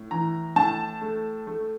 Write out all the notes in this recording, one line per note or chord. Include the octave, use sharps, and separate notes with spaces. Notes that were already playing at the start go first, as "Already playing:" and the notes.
Already playing: A2
E3 A#5
A2 A5
A3
A3